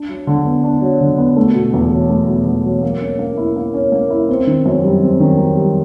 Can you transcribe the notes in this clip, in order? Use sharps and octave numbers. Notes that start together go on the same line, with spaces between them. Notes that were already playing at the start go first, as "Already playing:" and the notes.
Already playing: D4
F#3
D3
B3
D4
F#3
D3
B3
A3
B2
E2
F#3
A3
B2
E2
F#3
A#3
C#4
A#3
E4
A#3
C#4
A#3
E4
C4
D#3
F#2
G3
C4
D#3
F#2
G3